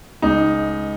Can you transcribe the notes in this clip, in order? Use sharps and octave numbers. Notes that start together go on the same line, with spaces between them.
C#2 D#4